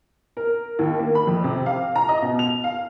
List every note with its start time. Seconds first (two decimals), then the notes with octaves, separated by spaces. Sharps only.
0.37 A#4
0.79 D#2
0.99 A#3
1.15 B5
1.27 F2
1.44 C3
1.66 F5
1.96 A#5
2.09 D#5
2.22 B2
2.39 F7
2.64 F5